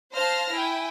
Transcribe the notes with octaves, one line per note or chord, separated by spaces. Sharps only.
C5 F5 A5 F6 A#6 C7
E4 G5 G#5